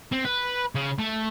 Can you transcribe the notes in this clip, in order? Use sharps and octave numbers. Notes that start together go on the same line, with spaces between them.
C4
B4
C#3
A3